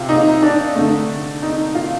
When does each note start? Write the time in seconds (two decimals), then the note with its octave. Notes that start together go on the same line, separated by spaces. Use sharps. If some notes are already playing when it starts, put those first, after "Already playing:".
Already playing: C3 F4
0.09 D#4
0.42 D4
0.76 D3 A3
1.42 D#4
1.75 F4